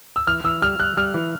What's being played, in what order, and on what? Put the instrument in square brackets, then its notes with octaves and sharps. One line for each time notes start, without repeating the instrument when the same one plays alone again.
[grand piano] E6
[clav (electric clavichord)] E3 [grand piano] F6
[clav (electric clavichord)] E3 [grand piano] E6
[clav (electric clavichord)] G3 [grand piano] F6
[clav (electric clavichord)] G3 [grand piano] F#6
[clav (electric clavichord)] G3 [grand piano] F6
[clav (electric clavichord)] E3